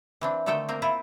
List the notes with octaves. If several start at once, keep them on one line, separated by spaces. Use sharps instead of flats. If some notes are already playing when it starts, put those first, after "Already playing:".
E3 C4 D4
D3 D#3 A3 A4 G5 A5
A#3 C4 A#4
C4 E4 F4